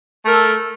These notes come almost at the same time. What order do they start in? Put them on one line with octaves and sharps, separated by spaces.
A3 A#4 A4